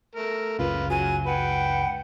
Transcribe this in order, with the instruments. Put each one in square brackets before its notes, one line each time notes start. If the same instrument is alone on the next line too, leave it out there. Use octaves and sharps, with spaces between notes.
[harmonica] A3 A#4
[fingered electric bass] F#1 C#2 C#3 [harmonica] F4 B4
[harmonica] F#3 [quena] G#5
[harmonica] B4 G5 [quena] F#5